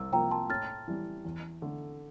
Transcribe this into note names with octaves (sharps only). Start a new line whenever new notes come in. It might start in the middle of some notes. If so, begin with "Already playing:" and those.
Already playing: C2 E6
C3 F3 A#3 G5 A#5
A5 C6
A2 F6 A6
E3 G3
E2
D3 A3